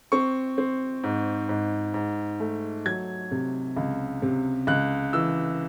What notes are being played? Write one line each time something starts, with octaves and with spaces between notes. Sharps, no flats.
C4 C#6
C4
G#2
G#2
G#2
A3
F#3 G#6
C3
C#2
C3
C#2 F#6
E3 E6